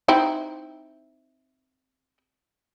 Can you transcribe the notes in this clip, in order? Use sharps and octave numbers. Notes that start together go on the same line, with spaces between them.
C4 D#4 E4